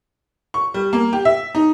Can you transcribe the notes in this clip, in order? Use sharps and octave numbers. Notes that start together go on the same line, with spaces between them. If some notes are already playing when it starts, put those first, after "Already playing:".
C#6
G3
A#3
G4
E5
D#4